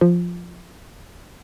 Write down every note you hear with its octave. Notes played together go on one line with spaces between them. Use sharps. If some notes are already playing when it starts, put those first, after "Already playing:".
F3